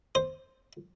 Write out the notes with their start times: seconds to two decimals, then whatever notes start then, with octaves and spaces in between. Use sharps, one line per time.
0.15 C5